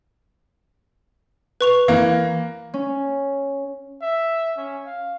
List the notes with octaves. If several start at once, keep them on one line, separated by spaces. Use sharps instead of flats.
B4 C#6 F7
E3 A#3
C#4
E5
C#4
F5